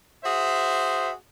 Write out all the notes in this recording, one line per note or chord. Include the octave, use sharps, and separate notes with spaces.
F#4 G#4 C5 E5